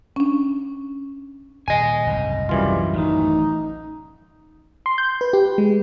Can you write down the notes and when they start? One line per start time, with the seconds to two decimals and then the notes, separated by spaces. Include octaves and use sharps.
0.16 C#4 D4
1.68 D#1 D#5 G#5
2.07 F#1 C2 G#2
2.49 F#2 E3 G3 F4
2.93 A1 A2 D#3 D#4
4.86 C6
4.98 G6
5.21 B4
5.33 G4
5.58 G#3